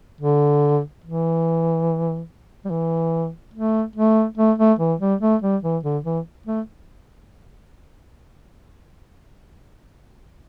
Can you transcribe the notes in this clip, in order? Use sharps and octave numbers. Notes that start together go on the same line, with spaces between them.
D3
E3
G3
E3
A3
A3
A3
A3
E3
G3
A3
G3
E3
D3
E3
A3